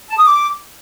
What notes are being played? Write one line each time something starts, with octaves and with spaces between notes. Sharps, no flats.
A5
D#6
D6